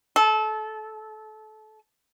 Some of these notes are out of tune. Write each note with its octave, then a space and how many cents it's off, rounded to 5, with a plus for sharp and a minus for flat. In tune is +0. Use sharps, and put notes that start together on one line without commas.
A4 -25